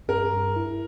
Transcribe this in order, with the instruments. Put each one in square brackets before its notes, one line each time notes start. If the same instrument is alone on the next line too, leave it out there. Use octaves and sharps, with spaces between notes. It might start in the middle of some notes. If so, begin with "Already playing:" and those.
[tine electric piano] G2 [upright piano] A#4
[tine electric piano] G2
E4